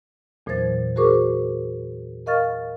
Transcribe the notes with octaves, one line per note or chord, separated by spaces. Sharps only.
E2 A#2 E3 F#3 C5 A6
F#4 G#4 A#4 C5 C#6 D6
A#4 D#5 F5 C#6 F6 A6